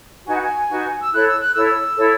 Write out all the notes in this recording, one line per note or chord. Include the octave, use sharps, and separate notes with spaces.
D#4 F#4 B4 G#5
F#5
G#5
D#4 F#4 B4
E6
E4 A4 C#5 F#6
E6
F#6
E4 A4 C#5 E6
E4 A4 C#5